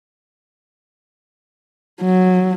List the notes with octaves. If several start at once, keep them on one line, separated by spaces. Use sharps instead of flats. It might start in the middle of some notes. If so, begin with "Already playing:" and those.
F#3